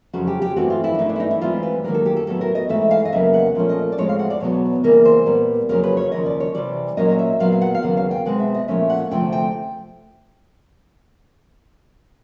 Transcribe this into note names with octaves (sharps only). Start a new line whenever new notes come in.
F2 C#3 F#3 F#4
G4
G4
G2 E3 A3 C4 F#4
F4
E4
D4
G2 E3 A3 D#4
D4
E4
D#4
E4
G#2 E3 G3 C4 F4
B4
G#2 D#3 F#3 A#3 A#4
A4
G4
A4
A2 F#3 B3 A4
A#4
D#5
G#2 E3 A3 E5
F5
D#5
E2 C#3 F#3 A#3 E5
F#5
A#2 F3 A3 C#4
D#5
D5
A2 F3 G#3 C4 C#5
F5
F#5
D5
E2 B2 F#3 B3 C#5
C#3 E3 G3 A#3 A#4
C5
A#2 G3 B3
F2 C#3 F#3 A#3 C#4 A#4
B4
C#5
D#2 C#3 F3 D#5
D5
C#5
C3 E3 G3 D5
A#2 F#3 A#3 C#4 D#5
D#5
E5
A#2 F#3 B3 F5
F5
F#5
F5
D#2 C#3 F#3 B3 F#5
F5
G5
B2 G#3 C4 F#5
E5
D#5
A#2 F3 A3 C#4 E5
F#5
D2 C3 F3 A3 C4 G5
G5